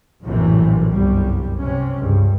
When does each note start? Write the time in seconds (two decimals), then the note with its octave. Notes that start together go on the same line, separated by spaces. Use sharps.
0.23 A#1 F#2 A2 C3 E3
0.90 G1 C2 F#2 G3
1.59 C3 C#4
1.97 C#2 G2